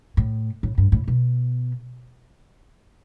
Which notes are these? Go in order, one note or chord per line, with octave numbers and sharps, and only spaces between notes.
A2
A2
G2
A2
B2